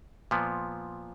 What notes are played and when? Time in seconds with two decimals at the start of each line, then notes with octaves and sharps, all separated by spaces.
0.31 A#2 F3 B3